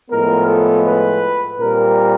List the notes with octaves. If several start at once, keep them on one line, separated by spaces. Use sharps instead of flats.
A2 F3 G#3 B3 A#4
A4
B4
A#2 G3 C4 A#4